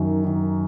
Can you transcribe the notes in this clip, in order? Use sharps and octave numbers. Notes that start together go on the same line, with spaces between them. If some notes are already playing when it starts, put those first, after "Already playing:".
Already playing: F#2 D#3
D#3